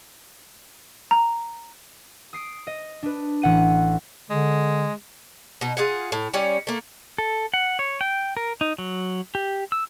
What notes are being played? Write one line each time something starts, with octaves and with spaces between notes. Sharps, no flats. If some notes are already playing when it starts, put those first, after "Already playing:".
A#5
D#6 C7 D7
D#5
D4 B4
A1 F#5 D#7
D3 G#3
B2 D#4
F4 G#4 F5 F#5
A2
G3 C#4 C#5 D5
A3 A#3
A4
F#5
C#5
G5
A#4
D#4
F#3
G4
E6